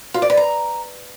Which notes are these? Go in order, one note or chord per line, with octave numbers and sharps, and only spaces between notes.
F4
D5
B4
A#5